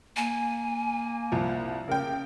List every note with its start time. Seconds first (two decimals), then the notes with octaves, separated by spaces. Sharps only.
0.16 A#3 G#5
1.32 C2 F3
1.88 C#3 G4 A#4 G5